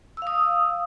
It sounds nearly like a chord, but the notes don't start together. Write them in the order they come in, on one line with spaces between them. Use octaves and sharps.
E6 F5 D#6